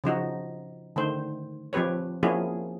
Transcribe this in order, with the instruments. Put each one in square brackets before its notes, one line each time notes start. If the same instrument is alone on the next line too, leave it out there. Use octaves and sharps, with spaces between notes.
[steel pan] C#3 F3 D#4 F#4
D3 D#3 A3 C5
F3 C4 G4 B4 C#5
F3 A#3 C#4 E4 F#4 G#4